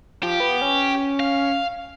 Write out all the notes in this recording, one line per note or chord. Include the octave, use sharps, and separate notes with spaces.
F3 G4
B3
C#4
F5